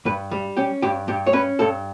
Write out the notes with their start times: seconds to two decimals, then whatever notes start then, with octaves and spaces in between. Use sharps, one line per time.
0.05 G2 B4
0.31 G3
0.57 C#4 G4
0.82 G2 G4
1.08 G2 G4
1.27 C#5
1.33 C#4 B4
1.59 G2 A4